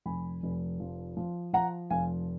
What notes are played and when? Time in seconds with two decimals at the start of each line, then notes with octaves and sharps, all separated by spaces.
0.06 F1 G#5 B5
0.43 F1
0.80 F3
1.17 F3
1.53 F3 F#5 A#5
1.90 F1 F5 G#5